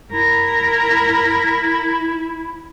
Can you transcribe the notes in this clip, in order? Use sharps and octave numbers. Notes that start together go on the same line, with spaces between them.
E4 A#4